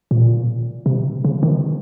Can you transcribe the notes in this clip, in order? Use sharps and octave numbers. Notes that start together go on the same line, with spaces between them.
A#2
C3
C#3
D#3